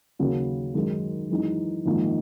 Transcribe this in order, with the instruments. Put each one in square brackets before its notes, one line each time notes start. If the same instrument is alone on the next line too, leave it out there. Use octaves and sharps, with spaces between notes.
[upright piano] D#2 C#3 F#3 A#3
F#2 D#3 G#3 D#4
F#2 E3 G#3 D#4
A#1 G#2 D#3 A#3